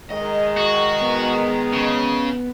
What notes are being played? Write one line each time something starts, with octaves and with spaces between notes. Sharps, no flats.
D#3 G#3 D#5
F#4
B3
C#3